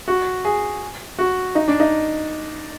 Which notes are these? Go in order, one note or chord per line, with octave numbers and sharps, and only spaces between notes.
F#4
G#4
F#4
D#4
D4
D#4